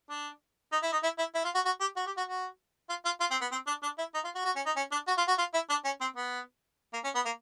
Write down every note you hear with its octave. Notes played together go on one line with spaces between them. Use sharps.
D4
D#4
E4
D#4
E4
E4
E4
F4
F#4
F#4
G4
F#4
G4
F#4
F#4
F4
F4
F4
C4
B3
C4
D4
D4
E4
D#4
F4
F#4
F#4
C#4
D#4
C#4
D4
F#4
F4
F#4
F4
E4
D4
C#4
C4
B3
A#3
C#4
B3
A#3